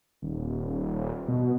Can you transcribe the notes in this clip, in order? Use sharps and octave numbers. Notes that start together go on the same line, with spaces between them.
D#1
B2